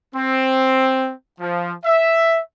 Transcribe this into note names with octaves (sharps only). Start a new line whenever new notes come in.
C4
F3
E5